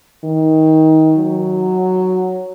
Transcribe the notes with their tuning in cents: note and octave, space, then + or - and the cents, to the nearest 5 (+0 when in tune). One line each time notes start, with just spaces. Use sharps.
D#3 +25
F#3 +0